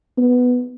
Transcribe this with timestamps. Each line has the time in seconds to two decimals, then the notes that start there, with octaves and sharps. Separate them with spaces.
0.18 B3